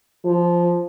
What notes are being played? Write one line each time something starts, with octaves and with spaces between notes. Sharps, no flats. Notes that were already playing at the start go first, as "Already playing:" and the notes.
F3